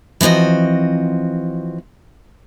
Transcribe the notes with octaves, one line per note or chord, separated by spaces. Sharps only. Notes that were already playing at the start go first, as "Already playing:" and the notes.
E3 F3 C4 F#4 D#5